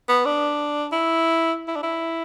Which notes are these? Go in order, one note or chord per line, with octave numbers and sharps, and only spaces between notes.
B3
D4
E4
E4
D4
E4